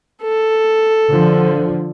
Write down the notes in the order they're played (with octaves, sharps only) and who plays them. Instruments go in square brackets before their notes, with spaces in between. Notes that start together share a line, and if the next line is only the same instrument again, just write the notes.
[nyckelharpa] A4
[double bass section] D3 F3